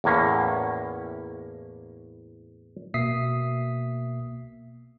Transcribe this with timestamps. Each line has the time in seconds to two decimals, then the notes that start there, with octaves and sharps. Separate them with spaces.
0.04 E2 A2 A#3 C#4
2.94 B2 A#3 E5 D#6 B6 C7